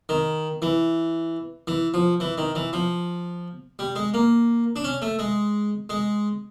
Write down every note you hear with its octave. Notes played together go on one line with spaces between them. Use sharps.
D#3
E3
E3
F3
E3
D#3
E3
F3
G3
G#3
A#3
D4
C#4
A3
G#3
G#3